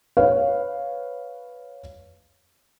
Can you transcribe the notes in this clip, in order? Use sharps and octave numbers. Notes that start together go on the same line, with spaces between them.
B4 C#5 F5